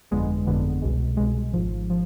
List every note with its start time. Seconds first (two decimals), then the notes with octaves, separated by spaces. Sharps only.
0.11 G1 F2 D3 G#3 B3
0.47 G1 F2 D3 G#3 B3
0.82 C2 B2 G#3
1.17 C2 B2 G#3
1.52 G#1 G#2 F3
1.90 F3